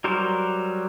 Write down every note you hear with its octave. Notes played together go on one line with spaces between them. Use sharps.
F#3 G3 A#4 C5